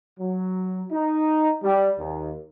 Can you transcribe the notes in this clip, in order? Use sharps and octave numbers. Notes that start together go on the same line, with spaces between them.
F#3
D#4
G3
D#2